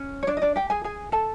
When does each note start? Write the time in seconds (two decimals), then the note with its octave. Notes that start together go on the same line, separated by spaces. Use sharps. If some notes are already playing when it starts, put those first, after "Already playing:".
Already playing: C#4
0.23 C#5
0.27 D4 D5
0.37 D#5
0.42 D4 D5
0.56 G4 G5
0.70 G#4 G#5
0.84 G#4 G#5
1.12 A4 A5